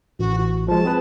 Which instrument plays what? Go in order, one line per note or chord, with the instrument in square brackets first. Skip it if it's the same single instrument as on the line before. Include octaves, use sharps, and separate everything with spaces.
[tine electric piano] A1 [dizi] F#4
[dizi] F#4
[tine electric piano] F3 G#3 [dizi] A5
[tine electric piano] C4 G#4 B4